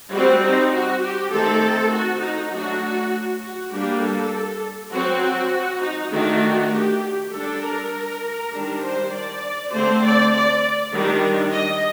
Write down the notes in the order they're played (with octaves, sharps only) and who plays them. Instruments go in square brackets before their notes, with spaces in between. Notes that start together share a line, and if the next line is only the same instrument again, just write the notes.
[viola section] G3 C4 F#4
D#4
F#4
G4
D#3 A3 C4 A4
F#4
D#4
F#3 A3 D4 F#4
F#4
G3 A#3 D4 G4
A4
F#3 C4 F#4
F#4
D#4
D#3 A3 D4 F#4
G4
G3 D4 A4
A#4
D#3 G3 D4
C5
D5
D3 A3 C4 C5
D5
D5
D#3 G3 D4
D#5